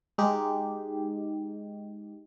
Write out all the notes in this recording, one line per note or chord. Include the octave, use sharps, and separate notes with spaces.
G#3 D#4 G4